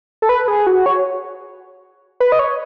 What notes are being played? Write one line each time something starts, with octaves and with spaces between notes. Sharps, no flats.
A4
B4
G#4
F#4
C#5
B4
D#5
C#5